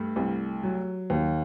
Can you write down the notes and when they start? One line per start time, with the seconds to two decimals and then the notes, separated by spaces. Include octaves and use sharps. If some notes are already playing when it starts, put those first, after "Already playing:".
Already playing: G2 A3
0.16 C2
0.63 F#3
1.10 D#2